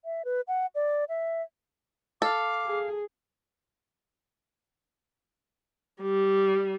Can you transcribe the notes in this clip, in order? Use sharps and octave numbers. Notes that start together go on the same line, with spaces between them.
E5
B4
F#5
D5
E5
A4 F5 D6
G#4
G3